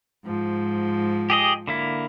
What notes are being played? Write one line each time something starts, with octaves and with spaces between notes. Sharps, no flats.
G#2 F3
G4 G#4 D#5
D3 A#3 E4